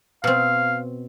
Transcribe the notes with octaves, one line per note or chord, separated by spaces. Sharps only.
B2 C4 F5